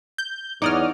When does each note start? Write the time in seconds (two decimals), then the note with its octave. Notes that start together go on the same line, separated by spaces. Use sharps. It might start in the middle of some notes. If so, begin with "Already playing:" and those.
0.18 G6
0.62 E2 D#4 C#5 D5 F#5 D6 D#6 F6